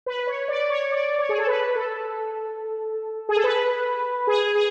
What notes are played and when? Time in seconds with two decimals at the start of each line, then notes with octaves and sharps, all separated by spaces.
0.06 B4
0.27 C#5
0.48 D5
0.69 C#5
0.91 D5
1.18 C#5
1.29 G#4
1.38 A4
1.47 B4
1.75 A4
3.29 G#4
3.36 A4
3.44 B4
4.27 G#4
4.55 G#4